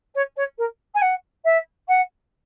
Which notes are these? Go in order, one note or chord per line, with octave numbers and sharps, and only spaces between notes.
C#5
C#5
A#4
G#5
F#5
E5
F#5